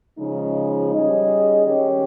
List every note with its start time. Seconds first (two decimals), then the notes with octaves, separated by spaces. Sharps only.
0.18 C#3 F3 G#3 D#4
0.92 G3 C#4 G#4 D#5
1.66 D#3 G#3 C#4 G4 C#5